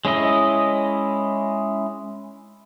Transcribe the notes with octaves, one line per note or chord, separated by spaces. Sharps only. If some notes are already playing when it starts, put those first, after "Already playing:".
G#3 C#4 E4 D#5